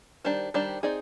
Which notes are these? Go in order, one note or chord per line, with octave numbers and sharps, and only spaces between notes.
D#3 G3 D4 G4 C5
D#3 G3 D4 G4 C5
C4 D#4 G#4 D5